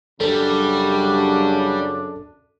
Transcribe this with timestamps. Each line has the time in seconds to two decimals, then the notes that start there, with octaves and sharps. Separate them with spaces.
0.21 F#2 C#3 G3 D4 A4